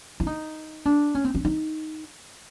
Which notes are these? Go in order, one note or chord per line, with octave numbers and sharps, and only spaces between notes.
E4
D#4
D4
C#4
C4
C#4
D#4